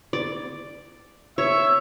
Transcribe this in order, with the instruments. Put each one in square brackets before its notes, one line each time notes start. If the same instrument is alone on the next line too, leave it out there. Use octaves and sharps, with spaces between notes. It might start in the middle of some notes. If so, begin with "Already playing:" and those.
[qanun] D5
[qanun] C#5 [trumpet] E5